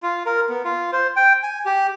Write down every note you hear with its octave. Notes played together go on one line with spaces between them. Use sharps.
F4
A#4
B3
F4
C5
G5
G#5
G4